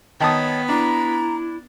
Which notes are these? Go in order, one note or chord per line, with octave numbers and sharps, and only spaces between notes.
D#3 B3 C#5 A5 B5 D#6
D4 E4 A#5